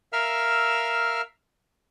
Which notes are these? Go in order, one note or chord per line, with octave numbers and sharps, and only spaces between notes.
A#4 E5 F5 E6 F6